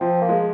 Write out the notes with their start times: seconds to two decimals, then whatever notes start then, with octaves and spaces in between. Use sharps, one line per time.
0.01 F3 C4
0.21 A#3
0.29 G#3